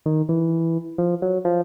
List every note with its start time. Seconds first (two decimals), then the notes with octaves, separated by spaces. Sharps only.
0.06 D#3
0.29 E3
0.98 F3
1.22 F#3
1.45 F3